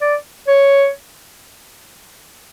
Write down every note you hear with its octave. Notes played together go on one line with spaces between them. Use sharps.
D5
C#5